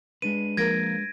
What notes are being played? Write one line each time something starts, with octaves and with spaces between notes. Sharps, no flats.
G#3 D4 B4 D#7
F3 A#3 A#4 G#6 A#6 D7